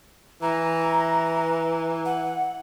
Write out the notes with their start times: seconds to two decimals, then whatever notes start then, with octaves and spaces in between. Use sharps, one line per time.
0.42 E3 A#5
2.05 F#5